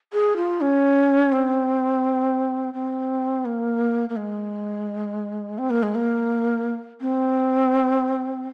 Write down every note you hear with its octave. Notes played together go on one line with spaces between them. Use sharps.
G#4
F4
C#4
C4
C4
A#3
A#3
G#3
C4
A#3
G#3
A#3
C4